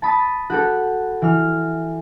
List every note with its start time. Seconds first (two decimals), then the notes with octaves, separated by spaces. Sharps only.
0.02 A5 B5 D#6 A6
0.50 F#4 G4 A4
1.22 E3 F6